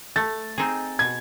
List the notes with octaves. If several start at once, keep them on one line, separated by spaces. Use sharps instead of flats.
A3 A6
C4 D#4 G#4
B2 G#6